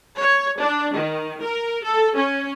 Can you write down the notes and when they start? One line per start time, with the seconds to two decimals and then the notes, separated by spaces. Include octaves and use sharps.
0.19 C#5
0.59 D4
0.95 D#3
1.42 A#4
1.83 A4
2.15 C#4